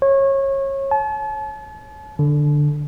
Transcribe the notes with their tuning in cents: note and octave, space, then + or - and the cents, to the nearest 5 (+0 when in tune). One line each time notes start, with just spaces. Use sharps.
C#5 -25
A5 -40
D3 +5